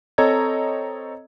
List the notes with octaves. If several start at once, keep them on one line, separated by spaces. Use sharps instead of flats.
C4 A4 C#5 D#5 A#5 G#6